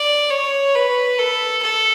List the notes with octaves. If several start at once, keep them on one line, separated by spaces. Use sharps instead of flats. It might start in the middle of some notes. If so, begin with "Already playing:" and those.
Already playing: D5
C#5
B4
A4
A4